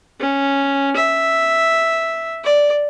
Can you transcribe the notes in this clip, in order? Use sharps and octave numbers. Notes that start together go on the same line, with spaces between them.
C#4
E5
D5